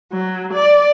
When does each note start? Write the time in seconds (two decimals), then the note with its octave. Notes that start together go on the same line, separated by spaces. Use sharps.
0.12 F#3
0.52 D5